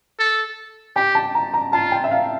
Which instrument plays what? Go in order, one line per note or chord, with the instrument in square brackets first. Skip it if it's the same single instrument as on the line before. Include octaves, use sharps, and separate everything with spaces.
[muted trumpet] A4
[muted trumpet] G4 [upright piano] G5
[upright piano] A5
A#5
A#5
[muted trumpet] F4 [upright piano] A5
[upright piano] G5
E5
F5